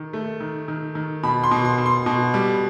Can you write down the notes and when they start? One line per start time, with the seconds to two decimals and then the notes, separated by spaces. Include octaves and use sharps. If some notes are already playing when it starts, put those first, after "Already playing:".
Already playing: D#3
0.13 A3
0.40 D#3
0.68 D#3
0.95 D#3
1.23 B2 B5
1.44 C6
1.51 B2
1.65 C6
1.78 B2
1.86 C6
2.06 B2
2.34 G3